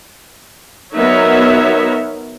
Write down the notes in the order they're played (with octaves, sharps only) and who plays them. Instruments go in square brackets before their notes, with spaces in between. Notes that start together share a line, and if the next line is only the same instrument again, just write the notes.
[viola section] F#3 B3 D#4 A#4 C#5 E5